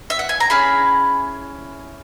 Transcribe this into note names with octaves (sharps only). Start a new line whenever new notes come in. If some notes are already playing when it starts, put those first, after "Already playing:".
E5
F#5
G#5
A#5
C#4 E4 G#4 B5